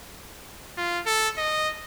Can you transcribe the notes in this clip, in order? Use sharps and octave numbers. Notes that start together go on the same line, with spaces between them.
F4
A4
D#5